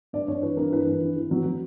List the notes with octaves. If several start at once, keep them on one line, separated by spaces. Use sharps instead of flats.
G2 D5
G2 C#5
E3 B4
G2 A#4
E3 B4
G2
E3
E3
F#3
F#3